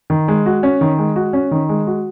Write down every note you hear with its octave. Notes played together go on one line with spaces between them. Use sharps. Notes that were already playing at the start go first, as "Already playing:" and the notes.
D#3
G#3
F#4
C#4
D#3
G#3
F#4
C#4
D#3
G#3
F#4